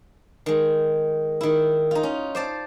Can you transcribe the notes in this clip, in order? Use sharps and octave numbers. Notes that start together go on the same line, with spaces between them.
D#3 G#3
D#3 E4
D#4 F4
C#4
C5 D5 A5